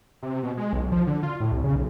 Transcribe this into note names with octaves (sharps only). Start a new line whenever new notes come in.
C3
B2
G#3
B1
F3
D3
F4
A2
C2
C#3
B1